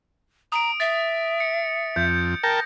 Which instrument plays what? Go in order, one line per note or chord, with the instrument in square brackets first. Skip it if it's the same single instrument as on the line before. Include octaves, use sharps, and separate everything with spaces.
[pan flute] A#5 [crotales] D#6 D7
[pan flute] E5 [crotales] A6
[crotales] C#7
[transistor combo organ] F2 [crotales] G6
[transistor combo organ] A#4 G5 A5 [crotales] A#6